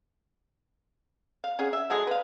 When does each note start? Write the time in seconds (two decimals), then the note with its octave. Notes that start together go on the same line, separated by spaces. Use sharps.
1.44 F5
1.59 C#4 G#4 F#5
1.73 E5
1.90 D3 F#3 G#3 G#4
2.07 B4 F5